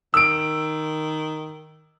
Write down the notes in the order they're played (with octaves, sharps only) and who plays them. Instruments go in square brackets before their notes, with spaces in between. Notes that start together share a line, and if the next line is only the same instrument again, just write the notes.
[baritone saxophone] D#3 [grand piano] E6 D7